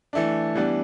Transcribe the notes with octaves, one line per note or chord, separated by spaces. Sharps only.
E3 A3 D4
E3 G3 B3 D4